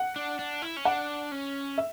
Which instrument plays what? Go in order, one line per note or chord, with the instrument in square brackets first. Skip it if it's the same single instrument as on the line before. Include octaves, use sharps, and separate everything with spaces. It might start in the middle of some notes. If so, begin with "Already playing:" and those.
Already playing: [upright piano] F#5
[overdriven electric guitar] D4
D4
E4
C#4
[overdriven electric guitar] D4 [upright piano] F#5
[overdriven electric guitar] C#4
[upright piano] E5